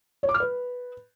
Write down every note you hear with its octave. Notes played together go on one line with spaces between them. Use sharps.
C#5
D6
F6
B4